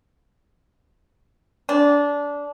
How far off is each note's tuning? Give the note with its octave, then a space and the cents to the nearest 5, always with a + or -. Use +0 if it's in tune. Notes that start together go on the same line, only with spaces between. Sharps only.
D4 -20